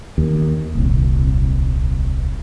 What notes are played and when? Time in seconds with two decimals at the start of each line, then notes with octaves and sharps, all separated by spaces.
0.18 D#2
0.75 D#1 C2